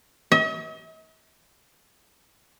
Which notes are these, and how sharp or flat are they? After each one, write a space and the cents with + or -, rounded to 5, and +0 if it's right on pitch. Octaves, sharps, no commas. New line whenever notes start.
D#5 +45